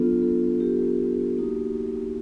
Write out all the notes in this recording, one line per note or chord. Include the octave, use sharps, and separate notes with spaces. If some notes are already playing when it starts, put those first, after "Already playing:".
Already playing: F#3 B3 D4 F4 A4
A4
G4
A#3 D#4 F#4